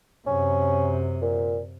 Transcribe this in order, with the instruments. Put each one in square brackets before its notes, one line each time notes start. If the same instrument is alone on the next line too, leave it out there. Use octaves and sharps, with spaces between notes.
[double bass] F#2 C3 [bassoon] C#4
[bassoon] A#2